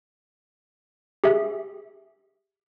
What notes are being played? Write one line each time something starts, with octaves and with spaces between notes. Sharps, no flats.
G4 G#4 E5